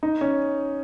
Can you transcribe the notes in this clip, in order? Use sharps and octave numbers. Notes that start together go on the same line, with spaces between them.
D#4
C#4